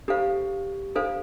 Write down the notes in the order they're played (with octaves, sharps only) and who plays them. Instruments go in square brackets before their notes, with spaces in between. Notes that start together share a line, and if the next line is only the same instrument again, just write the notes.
[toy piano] D4 A4 C5 F5 [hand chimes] G4
[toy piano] D4 A4 C5 F5